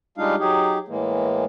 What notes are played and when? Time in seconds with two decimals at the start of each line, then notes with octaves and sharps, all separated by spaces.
0.18 G3 G#3 D4 D#4 F4 F5
0.39 F#3 D#4 G4 G#4
0.88 A2 E3 G#3 A#3